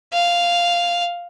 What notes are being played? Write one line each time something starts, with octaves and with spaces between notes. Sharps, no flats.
F5